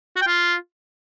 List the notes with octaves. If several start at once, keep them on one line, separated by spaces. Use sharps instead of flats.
F#4
G5
F4